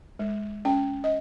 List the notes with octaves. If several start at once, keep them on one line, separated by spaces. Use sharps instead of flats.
G#3
C#4 G5
D#5